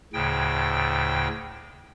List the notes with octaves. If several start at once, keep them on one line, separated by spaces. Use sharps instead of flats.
D2 A2 C#3 G5